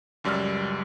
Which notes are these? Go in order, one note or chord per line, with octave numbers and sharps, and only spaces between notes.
C#2 F#2 G3 D5 E6 F6